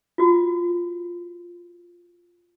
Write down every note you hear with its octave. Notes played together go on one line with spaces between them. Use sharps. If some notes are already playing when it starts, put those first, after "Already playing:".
F4 F#4